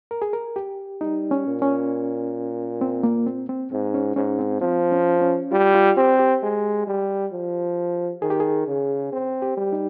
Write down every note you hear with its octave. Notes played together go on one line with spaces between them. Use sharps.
A#4
G#4
A#4
G4
G3 D#4
C#4
A#2
C#4
C4
A#3
C4
C4
G#2 C4
C#4
G#2 C#4
C4
F3 C4
C#4
C#4
G3 F4
F4
C4 G4
G4
G#3
G3
F3
D#3 G#4
G4
G#4
C#3
C4
G4
G3
D#4